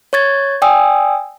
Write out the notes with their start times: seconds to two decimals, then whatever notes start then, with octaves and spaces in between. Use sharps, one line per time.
0.13 C#5 C#6 G#6 A6
0.62 D5 G5 G#5 D#6 E6